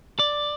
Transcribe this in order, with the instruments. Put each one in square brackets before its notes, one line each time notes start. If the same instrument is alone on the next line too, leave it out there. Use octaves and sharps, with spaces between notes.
[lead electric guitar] D5